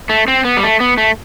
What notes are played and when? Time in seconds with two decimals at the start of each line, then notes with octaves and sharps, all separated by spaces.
0.09 A3
0.28 C4
0.45 B3
0.57 G3
0.63 A3
0.80 B3
0.98 A3